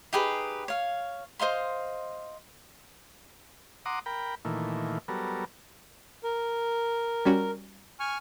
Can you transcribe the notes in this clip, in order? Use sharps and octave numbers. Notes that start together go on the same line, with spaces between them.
D#4 G4 G#4 B4
C#5 F5
C5 D#5 F5 C6
F#5 A#5 C6 D6 D#6
A#4 G5 B5
A#2 D#3 E3 A3
F#3 G3 B3 A4 A#4
A#4
G3 C#4 F#4
G#5 C#6 F6